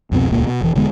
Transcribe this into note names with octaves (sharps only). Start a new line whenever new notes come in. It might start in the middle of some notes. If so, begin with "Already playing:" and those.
C2 F2 B2 C4
D#1 C#2 A#2 A#3
B2
E1 E3
E1 D3 G#3 B3